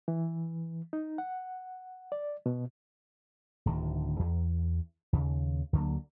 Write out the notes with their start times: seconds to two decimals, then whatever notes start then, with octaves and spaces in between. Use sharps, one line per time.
0.08 E3
0.93 D#4
1.18 F#5
2.12 D5
2.46 B2
3.66 D1 D2 D3 D#3
4.19 E2
5.13 D#2 C#3
5.73 D2 D3 F#3 A#3